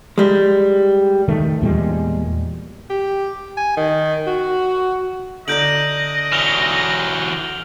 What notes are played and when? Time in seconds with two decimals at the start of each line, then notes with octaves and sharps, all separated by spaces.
0.18 G3 G#3
1.28 D#3 A3
1.62 E2 A#2 G3 G#3
2.90 G4
3.57 G#5
3.77 D#3
4.27 F#4
5.48 D3 A#4 D5 D#5 G6 D7 F#7
6.32 E3 F#3 F6 F7 G7